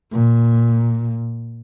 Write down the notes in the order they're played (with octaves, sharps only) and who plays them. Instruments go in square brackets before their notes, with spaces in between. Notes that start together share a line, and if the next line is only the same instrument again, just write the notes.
[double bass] A#2